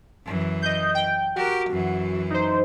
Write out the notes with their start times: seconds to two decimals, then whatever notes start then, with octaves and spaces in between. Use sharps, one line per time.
0.24 F#2 E3
0.62 D#5 G6
0.95 G5
1.36 F#4 G4 A#4
1.69 F#2 E3
2.30 D#4 C5